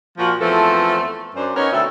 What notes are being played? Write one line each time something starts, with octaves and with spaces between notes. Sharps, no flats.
A#2 F3 F4 F#4
E2 F3 A3 C4 A4 B4
F#2 D4 C5
B3 C#4 D#4 A#4 C#5
D2 B2 C4 A4 E5